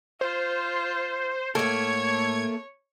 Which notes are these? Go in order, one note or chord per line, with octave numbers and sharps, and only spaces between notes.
F4 C5
A2 A3 A#3 A4 C#5 G#6